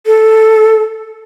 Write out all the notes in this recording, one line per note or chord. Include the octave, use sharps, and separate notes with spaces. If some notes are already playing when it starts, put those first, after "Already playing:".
A4